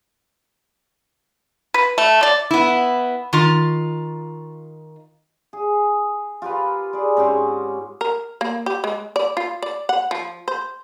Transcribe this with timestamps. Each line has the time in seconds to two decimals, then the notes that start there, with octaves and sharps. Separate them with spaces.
1.74 B4
1.98 A3
2.23 D5
2.51 B3 E4
3.33 D#3 F4
5.53 G#4
6.42 F4 G4 A#4 B4
6.93 G#4 D5
7.17 G#2 C4 C#4 G4
8.01 A#4
8.41 A#3
8.66 G4
8.84 G#3
9.16 D5
9.37 F4
9.62 D5
9.89 F#5
10.11 F3
10.48 C5